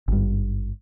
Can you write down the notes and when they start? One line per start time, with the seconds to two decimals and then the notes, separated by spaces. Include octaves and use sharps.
0.08 G#1 G2